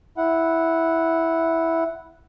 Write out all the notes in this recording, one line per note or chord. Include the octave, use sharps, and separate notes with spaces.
E4 F#5